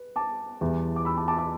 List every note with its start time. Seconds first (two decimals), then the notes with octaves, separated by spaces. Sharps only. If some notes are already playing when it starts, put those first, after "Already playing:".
Already playing: B4
0.16 A5 D6
0.61 E2 E3 G3
0.96 D6
1.05 B5 E6
1.17 A5 D6
1.28 A5 D6
1.38 A5 D6